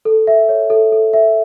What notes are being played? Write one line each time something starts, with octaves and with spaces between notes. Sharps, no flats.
A4
E5
C#5
A4
A4
E5